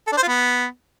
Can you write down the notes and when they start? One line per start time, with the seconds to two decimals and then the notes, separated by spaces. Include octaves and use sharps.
0.07 A4
0.12 D4
0.17 C5
0.22 F4
0.28 B3